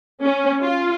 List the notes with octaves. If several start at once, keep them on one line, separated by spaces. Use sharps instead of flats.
C#4
F4